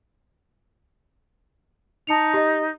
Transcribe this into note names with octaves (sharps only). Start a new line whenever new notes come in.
D#4 A5 C#7 F7
G4 D#5